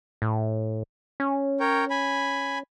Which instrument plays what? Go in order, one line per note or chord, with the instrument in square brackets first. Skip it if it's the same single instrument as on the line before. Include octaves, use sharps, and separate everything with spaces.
[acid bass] A2
C#4
[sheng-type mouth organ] A#4 C#5 G5
G#5 B5